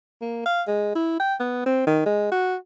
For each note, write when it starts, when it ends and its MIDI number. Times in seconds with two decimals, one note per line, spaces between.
0.21 0.45 58
0.46 0.62 77
0.67 0.94 56
0.95 1.17 64
1.20 1.35 79
1.40 1.62 59
1.66 1.86 60
1.87 2.04 51
2.06 2.31 56
2.32 2.56 66